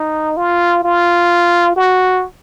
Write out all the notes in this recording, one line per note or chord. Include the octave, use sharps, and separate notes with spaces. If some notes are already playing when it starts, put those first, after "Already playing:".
Already playing: D#4
F4
F4
F#4